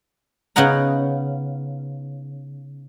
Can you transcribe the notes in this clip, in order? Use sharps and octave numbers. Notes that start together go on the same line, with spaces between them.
C#3 B3 D#4 F#5 A#5